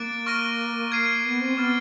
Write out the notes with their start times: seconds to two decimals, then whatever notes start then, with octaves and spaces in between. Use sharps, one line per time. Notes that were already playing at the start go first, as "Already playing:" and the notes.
Already playing: A#3 D6 F#6 A6 D7
0.26 C#6 F6 A#6 D#7
0.92 F6 G#6 C7 D#7
1.24 B3
1.40 C4
1.56 B3 D6 F6 A6